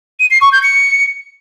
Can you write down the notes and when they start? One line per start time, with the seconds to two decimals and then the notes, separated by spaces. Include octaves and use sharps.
0.20 D#7
0.31 C7
0.41 C#6
0.52 G6
0.63 C#7